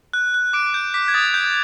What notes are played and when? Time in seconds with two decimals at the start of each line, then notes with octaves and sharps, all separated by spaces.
0.13 F#6
0.34 F#6
0.53 D6 D7
0.74 G6
0.94 D6 B6
1.08 G#6
1.14 D#6 A6
1.34 G6